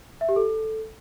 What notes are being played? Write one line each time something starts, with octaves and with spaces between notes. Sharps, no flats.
E5
G4
A4